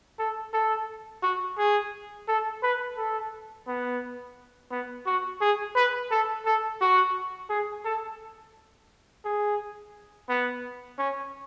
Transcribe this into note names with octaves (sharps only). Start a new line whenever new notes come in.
A4
A4
F#4
G#4
A4
B4
A4
B3
B3
F#4
G#4
B4
A4
A4
F#4
G#4
A4
G#4
B3
C#4